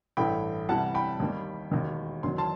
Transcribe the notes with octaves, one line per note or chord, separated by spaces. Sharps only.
A1 G2 E3 A3 G5 B5
C2 C3 E3 G3 F#5 A5
G5 B5
D#2 D#3 G3
E1 D#2 D#3
F#1 E2 D#3 F#3 C6
A5 C6